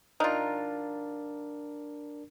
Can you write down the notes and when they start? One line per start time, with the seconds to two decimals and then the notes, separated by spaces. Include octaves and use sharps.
0.20 D4 D#4 F4 A#4